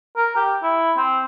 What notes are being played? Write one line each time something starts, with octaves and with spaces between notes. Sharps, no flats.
A#4
G4
E4
C4